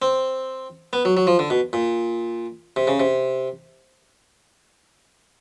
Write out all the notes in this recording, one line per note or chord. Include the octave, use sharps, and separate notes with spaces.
C4
B3
F#3
F#3
F3
D3
B2
A#2
C3
C#3
C3